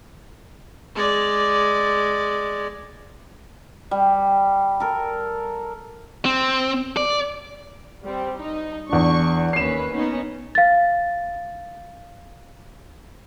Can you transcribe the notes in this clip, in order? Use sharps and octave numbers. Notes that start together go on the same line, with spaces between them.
G#3 D5
G3
A4 A#4
C4
D5
G3 C4
D#4
E2 D4 C#6
D#2 C#4 B4 C7 E7
B3 C#4 D#4
F5 A6